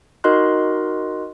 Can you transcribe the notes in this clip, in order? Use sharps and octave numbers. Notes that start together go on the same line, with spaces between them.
D#4 F#4 A#4 D#5 C6 F#6